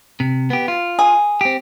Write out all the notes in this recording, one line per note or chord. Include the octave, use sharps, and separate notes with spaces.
C3
B3 G4
F4
G#4
C4 G4